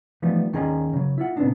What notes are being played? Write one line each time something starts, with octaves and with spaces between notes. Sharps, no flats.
E3 F3 G3 A3 B3 D#4
D#2 D#3 C#4 G#4 D#5 A#5
C#3 F#3
E4 F4 F#5
A#2 C#3 B3 C4 D4 D#4